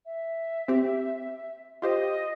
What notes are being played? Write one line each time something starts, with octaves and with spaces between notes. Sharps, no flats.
E5
C4 G4
F4 G4 C5 D#5